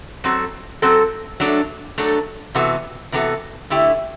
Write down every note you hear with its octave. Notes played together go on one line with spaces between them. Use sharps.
F#3 C4 F#4 A4
F#3 C4 F#4 A4
F#3 A3 D4 A4
F#3 A3 D4 A4
C3 E3 B3 F#4 A4
C3 E3 B3 F#4 A4
D3 A3 E4 G4